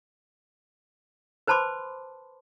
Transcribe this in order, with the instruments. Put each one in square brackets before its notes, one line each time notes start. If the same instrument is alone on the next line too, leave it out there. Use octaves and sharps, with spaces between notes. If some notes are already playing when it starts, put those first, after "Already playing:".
[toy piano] B4 C5 A5 B5 C6 D6